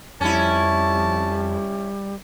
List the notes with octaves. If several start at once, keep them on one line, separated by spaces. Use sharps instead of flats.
F2 G3 C#4 E4 A5